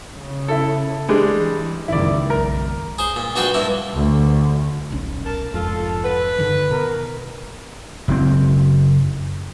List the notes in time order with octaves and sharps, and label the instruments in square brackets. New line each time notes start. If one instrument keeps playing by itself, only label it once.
[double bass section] C#3
[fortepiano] E4 A4
[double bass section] E3 [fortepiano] G3 G#3 D4
[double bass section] F#1 C#2 D#3 [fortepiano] E4 D5
[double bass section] B1 [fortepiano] A#4
[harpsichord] G#4 C5
A#2
A#1 G3 F#4 B4 C5 G5
G2 A#3 E4
[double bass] D2
[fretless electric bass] D#1 B1 C#4
[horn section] A#4 A5
[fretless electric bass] F1 F2 G#2 [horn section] F4 [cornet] A4
[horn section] B4
[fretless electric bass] G2 D3 D#3
[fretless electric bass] B2 [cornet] A#4
[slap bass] F#1 A2 C4